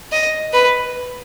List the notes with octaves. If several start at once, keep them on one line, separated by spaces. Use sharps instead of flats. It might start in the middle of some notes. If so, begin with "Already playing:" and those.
D#5
B4